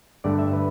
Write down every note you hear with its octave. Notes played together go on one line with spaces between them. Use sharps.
G2 D3 A3 D5
E5
B4